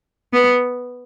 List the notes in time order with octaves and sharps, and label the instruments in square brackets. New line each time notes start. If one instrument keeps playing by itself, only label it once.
[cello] B3